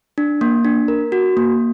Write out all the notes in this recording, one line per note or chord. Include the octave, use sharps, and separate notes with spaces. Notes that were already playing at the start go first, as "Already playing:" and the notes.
D4
A#3
D4
A#4
F#4
A#3